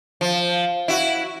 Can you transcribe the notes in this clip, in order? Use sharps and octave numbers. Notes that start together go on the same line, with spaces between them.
F3
E4 F#4